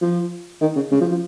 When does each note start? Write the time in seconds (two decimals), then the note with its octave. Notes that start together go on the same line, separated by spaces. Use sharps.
0.01 F3
0.61 D#3
0.76 C#3
0.92 C#3
1.01 F3
1.11 F3